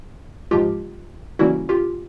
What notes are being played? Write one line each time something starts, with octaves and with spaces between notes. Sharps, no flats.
G#2 F3 G#3 F4 G4
C#3 E3 G3 A#3 C#4 E4 F#4
F4 G4